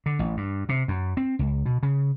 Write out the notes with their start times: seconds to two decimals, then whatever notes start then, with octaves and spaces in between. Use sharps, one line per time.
0.06 D3
0.19 A1
0.37 G2
0.69 C3
0.88 F#2
1.17 C4
1.39 C#2
1.66 B2
1.83 C#3